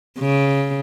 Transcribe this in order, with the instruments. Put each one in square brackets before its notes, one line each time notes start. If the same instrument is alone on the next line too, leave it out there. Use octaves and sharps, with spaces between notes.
[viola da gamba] C#3